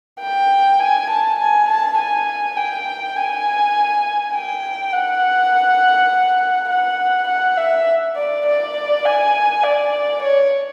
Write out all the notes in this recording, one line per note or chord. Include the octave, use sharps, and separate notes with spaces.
G5
G#5
A5
G#5
A5
G#5
G5
G#5
G5
F#5
F#5
F#5
E5
D5
D5
G#5
D5
C#5